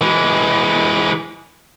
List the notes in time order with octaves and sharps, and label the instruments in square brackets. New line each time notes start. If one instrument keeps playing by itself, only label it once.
[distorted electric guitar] E3 G#3